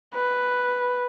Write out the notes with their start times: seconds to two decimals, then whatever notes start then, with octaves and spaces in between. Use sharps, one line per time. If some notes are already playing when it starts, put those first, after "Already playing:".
0.15 B4